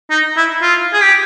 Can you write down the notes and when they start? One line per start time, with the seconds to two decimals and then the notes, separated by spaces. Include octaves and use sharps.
0.11 D#4
0.37 E4
0.62 F4
0.93 G#4
1.02 G4